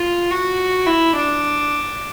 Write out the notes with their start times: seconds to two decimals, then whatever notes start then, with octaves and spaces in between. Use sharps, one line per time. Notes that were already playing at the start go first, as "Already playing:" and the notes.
Already playing: F4
0.31 F#4
0.86 E4
1.16 D4